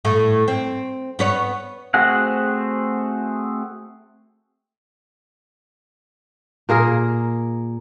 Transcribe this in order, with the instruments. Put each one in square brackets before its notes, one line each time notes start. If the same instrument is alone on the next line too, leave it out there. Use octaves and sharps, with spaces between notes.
[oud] A2 A3
C4
B3 B4 C#5
[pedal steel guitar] A3 C4 F#4 G#4 F#5
[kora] A#2 A#3 G#4 A#4